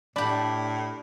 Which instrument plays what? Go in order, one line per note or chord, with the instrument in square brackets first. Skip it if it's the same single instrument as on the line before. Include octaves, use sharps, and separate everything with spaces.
[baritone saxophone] A2 [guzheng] D4 G4 [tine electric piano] D5 B5